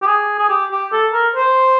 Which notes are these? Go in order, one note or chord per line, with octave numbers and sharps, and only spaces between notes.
G4
G#4
G#4
G4
G4
A4
A#4
C5